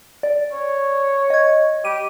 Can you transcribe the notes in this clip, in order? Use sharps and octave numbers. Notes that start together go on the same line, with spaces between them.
D5
C#5
D#5 G#6
G4 D#7